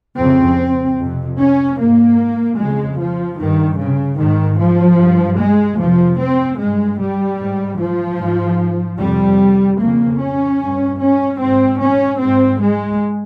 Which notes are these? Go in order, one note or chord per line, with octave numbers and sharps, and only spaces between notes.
F2 C#3 C4
F2 C3
C#4
G#2 A#3
F2 C#3 G#3
F3
G2 D#3
C#3
G#2 D#3
F3
G2
G#3
F2 C3 F3
C4
G2 G#3
G3
G#2
F3
G#2
F2 C3 G3
F2 C#3 A#3
C#4
G2
C#4
G#2 C4
C#4
G#2 C4
G#3